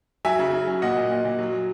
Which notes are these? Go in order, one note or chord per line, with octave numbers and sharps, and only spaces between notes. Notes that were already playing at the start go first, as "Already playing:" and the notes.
F#3 E5 G#5
C#3
C#3
F#3
A#2 D#5 F#5
A#2
A#2
A#2
F#3
F#3